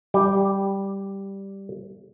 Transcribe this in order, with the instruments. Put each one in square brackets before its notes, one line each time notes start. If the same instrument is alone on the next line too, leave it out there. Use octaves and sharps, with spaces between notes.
[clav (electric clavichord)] G3 G4